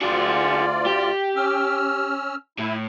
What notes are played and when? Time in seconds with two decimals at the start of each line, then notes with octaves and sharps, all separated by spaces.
0.02 D2 F4 F#4 G#4 D5
0.87 G4
1.36 C#4 E6 F6
2.58 A2 E4